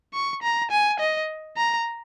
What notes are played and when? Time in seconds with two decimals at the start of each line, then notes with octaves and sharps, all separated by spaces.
0.14 C#6
0.43 A#5
0.71 G#5
1.00 D#5
1.57 A#5